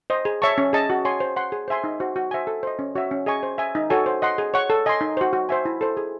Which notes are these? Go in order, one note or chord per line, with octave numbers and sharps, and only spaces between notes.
C5 D#5
G#4
C#5 E5 A5 C#6
C#4
G#4 D#5 A5
F#4
C#5 G#5 C6
C5
F#5 C6
G#4
C5 E5 G#5 C6
D#4
F#4 C5
F#4
C5 E5 G#5
A4
C5 D#5
C#4
F#4 C#5 E5
C#4
G#4 D#5 G#5 C#6
C5
E5 G#5
D#4
F#4 A4 C#5 G#5
C5
D#5 F#5 C6
G#4
C#5 F#5 C#6
A4
D#5 G#5 C6
D#4
F#4 C5
F#4
C5 E5 G#5
E4
A4 C5
G#4